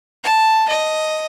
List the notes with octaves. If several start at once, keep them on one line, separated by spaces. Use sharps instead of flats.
A5
D#5